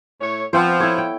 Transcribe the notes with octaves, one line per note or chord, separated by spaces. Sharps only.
A2 C#5
F3 B3 C4 C5
E4 A4 C#5
G5